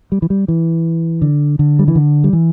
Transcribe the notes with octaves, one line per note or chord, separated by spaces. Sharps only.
G3
E3
G3
E3
D3
D3
G3
E3
D3
G3
E3